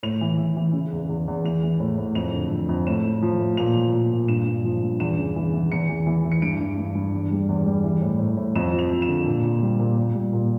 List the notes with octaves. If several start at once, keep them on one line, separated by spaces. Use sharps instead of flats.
A2 F7
E3
E3
E3
C#3
E2
E2
E2
E3 F7
E3
A2
A2
F2 F7
D3
F2
F2
A2 E7
A2
F3
A2
A#2 F7
F3
A#2
A#2
G2 E7
G2
F3
G2
E2 E7
C#3
E3
E3
E2 C#7
E3
E3
E3
C#7
G2 D7
G2
G2
G2
E2
G3
E2
G3
E3
A2
A2
A2
F2 E7
F3
F7
F2
E7
D3
A#2
A#2
G3
A#2
A#2
G3
A#2